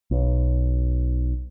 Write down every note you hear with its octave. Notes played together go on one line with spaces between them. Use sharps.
B1